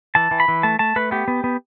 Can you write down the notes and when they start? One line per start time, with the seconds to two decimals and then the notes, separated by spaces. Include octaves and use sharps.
0.15 E3 A5
0.31 E3
0.40 B5
0.48 E3
0.63 A3 A5
0.79 A3 A5
0.96 A3 B4
1.11 B3 G4
1.28 B3
1.44 B3